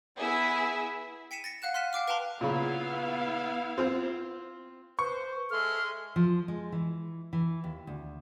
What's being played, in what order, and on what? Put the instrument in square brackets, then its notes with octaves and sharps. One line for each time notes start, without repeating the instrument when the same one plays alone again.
[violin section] B3 E4 G#4 E5
[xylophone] G5 B6 C#7 D#7 E7
A6 A#6 C#7
F5 F#5 F#6 E7
C6 F6 F#6 B6 D#7 E7
F5 G5 D6 F6
B4 F5 G5 A5 A#5 C6
[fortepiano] A#2 C#3 B5 [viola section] B3 E4 F5
[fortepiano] C4 F4 C5
[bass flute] B4 [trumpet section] C5 [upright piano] C#6
[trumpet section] G#3 E5 C6 [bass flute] A4 [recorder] F6
[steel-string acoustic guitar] F3
G#3
E3
E3
D#2
D2